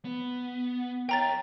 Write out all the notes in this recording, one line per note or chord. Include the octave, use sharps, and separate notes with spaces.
B3
A#4 C#5 G5 A#5 A6